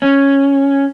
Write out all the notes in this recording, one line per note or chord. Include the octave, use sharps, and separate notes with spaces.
C#4